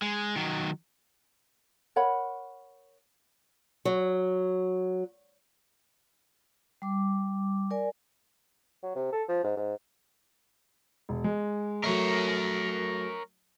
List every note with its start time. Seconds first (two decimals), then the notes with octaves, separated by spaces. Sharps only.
0.02 G#3
0.36 D#3 F#3
1.96 A#4 C#5 F#5 B5
3.85 F#3
6.82 G3 D6
7.71 A#4 D5 G#5
8.83 F#3
8.95 C3
9.13 A4
9.28 F3
9.44 G#2
9.57 G#2
11.09 E1
11.24 G#3
11.84 F#3 A3 A#4 C#5